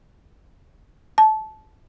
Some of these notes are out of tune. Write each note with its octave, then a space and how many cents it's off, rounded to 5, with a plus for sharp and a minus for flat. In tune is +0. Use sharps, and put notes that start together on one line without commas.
A5 -20